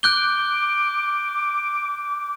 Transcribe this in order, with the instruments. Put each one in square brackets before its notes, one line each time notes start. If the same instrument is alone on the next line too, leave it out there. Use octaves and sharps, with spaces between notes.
[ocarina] D6 [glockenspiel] F#6 G6 G7